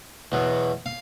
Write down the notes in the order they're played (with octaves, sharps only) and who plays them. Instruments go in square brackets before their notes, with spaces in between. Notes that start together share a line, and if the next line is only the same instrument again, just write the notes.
[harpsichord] E2 B2 F#3
F5